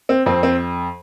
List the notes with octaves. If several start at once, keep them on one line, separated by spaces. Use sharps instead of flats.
C4
F2 C4
C4